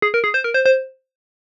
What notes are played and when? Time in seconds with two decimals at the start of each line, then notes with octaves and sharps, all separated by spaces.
0.02 G#4
0.14 A#4
0.24 G#4
0.34 C5
0.44 A#4
0.54 C5
0.66 C5